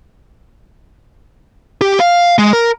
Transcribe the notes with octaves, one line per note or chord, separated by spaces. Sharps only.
G4
F5
G#3
A#4